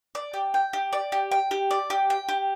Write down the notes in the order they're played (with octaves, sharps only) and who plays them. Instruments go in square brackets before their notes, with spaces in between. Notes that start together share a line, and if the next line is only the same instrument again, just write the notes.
[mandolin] D5
G4
G5
G4
D5
G4
G5
G4
D5
G4
G5
G4